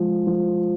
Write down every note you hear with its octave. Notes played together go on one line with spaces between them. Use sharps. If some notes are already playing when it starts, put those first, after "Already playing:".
Already playing: F3 G#3
F3